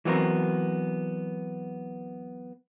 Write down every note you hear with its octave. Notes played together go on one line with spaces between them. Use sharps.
E3 F#3 B3 C4 A#4